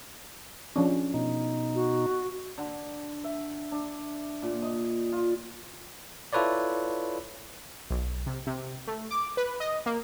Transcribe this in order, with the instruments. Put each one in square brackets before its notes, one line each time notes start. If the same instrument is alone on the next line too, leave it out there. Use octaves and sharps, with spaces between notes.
[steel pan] F3 C#4 D4
[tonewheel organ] B2 D#4
[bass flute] F#4
[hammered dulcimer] D3
E5
D4
A#2
D#5
F4
[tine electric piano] E4 F4 A4 B4 C#5 D5
[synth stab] B1
C3
C3
A3
D6
B4
D#5
A#3